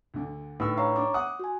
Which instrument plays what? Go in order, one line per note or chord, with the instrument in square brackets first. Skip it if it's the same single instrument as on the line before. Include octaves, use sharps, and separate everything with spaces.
[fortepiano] D2 D3
[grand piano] A2 E6 [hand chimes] D4 D#4 B4
[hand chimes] C#5 A#5 C#6 [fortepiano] F5
[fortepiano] D4 [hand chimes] D6
[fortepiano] F#5 [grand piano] D#6
[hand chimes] F#4 G#5